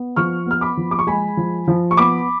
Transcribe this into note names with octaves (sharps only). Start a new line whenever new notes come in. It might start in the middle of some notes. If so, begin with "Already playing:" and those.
Already playing: B3
F3 C#6 F6
B3 F6
B5 D6
F3
D6
C#6
G#3 G#5 B5
F3
F3
C#6
B3 B5 D6